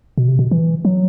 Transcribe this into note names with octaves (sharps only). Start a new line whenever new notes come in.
B2
C3
B2
E3
F#3